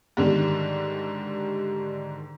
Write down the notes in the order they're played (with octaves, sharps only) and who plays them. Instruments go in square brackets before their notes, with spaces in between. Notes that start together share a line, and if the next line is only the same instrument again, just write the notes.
[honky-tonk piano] G#2 D3 D#3 G3